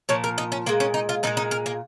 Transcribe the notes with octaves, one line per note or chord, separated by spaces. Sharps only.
A#2 F3 C#5
A#4
D#4
C#4
A#2 G#3 A#3
C#4
D#4
F4
A#2 F3 G#3 D#4
D#4
A#4
A#3